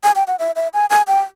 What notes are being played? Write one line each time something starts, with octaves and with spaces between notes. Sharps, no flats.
G#5
G5
F#5
E5
E5
G#5
G#5
G5